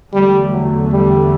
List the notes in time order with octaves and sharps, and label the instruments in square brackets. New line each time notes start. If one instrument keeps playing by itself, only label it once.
[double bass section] E2 D3 A3 [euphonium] G3
[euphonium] F#3
G3